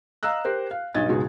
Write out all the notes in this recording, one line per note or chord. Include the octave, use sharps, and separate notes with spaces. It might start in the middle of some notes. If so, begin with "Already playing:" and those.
D#5 F5 A#5 E6 F#6
G4 A#4 C5
F5
B1 G2 D#5 G#6 A6
C#2 G#2 B2 F#4 G#4